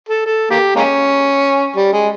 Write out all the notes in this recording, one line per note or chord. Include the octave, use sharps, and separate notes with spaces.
A4
A4
A#3 G4
G#3 A#3 C#4
G3
G#3